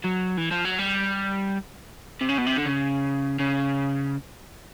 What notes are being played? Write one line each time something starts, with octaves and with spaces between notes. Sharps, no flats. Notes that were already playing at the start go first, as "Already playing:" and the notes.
F#3
E3
F3
F#3
G3
C3
C#3
B2
C3
D3
C#3
C#3